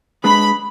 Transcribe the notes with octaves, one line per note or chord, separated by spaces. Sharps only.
G#3 D4 G#4 B4 B5